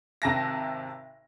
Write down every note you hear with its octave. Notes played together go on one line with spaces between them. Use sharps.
G#1 C3 A5 A#6